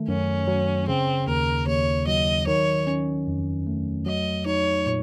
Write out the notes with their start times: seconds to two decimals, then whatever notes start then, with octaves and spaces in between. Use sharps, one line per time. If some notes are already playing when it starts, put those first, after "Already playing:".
Already playing: D#3 A3
0.08 F#2 C#4
0.47 F#3
0.87 C#3 C4
1.27 D#2 A#4
1.67 D#2 C#5
2.07 F#3 D#5
2.47 D#3 C#5
2.87 C#4
3.27 F2
3.67 A3
4.06 F#3 D#5
4.46 D#4 C#5
4.86 A#2